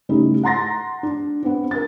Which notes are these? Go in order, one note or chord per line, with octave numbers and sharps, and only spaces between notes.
C#3 G3 A3 D#4 E4
F#5 A#5 C6 A6 A#6
D4
B3 C4 D4
A#4 A6